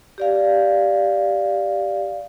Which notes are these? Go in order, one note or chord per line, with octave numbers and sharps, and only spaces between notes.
G4 D5 F5